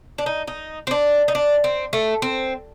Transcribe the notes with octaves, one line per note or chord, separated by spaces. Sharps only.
D4
D#4
D#4
C4
D4
D#4
D4
C4
A3
C4